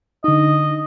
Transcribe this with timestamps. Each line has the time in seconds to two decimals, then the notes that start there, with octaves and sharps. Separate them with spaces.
0.24 D3 D#4 D#5